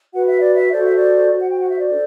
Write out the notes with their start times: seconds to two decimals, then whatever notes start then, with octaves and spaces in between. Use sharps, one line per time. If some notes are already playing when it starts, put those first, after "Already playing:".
0.13 F#4 B4 F#5
0.27 E5
0.41 D5
0.55 E5
0.71 F#4 A4 C5 D5
0.84 E5
0.95 D5
1.30 F#4 C5
1.40 F#5
1.49 G5
1.59 F#5
1.69 E5
1.79 D5
1.89 D4 A4 C5